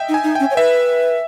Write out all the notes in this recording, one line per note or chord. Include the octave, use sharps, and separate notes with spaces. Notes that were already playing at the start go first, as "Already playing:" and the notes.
Already playing: D#5 E5 G5
D#4
G#5
D#4
C#4 G5
C#5
B4 E5